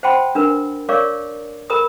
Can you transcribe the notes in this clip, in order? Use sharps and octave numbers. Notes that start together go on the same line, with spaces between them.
C5 F#5 G5 A5 B5 C6
D4 A#4 B4
A#4 C#5 D5 F5 C#6 D6
A#4 B4 A#5 B5 D#6